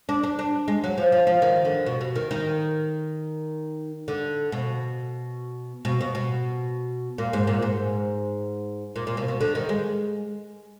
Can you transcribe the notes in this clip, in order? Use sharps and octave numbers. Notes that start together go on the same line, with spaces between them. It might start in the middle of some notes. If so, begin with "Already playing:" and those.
D4
D4
D4
G#3
F#3
F3
F3
F3
D#3
D3
B2
B2
D#3
D#3
D3
B2
B2
B2
B2
A#2
G#2
A#2
G#2
A#2
A#2
B2
B2
D3
D#3
G#3